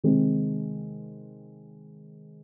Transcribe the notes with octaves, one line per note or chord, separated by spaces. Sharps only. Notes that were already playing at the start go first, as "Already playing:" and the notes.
C3 D#3 G#3 C4